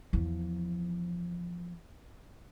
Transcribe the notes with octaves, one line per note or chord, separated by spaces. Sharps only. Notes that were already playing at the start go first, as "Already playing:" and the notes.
E2 F3